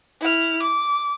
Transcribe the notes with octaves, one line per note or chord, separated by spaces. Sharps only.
E4 F6
D6